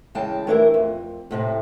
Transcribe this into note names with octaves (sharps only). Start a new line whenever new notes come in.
C#3 E3 G#3 G5 A5
E3 A3 D4 E4 G4 A#4
F2
A2 C3 A5